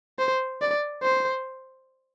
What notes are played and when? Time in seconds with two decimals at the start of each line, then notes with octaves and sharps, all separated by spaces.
0.19 C5
0.61 D5
1.02 C5